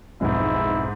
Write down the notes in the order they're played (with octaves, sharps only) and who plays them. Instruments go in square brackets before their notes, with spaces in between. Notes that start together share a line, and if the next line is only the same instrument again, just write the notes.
[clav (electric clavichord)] B1 F2 [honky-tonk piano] G#2 G#3 [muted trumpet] E4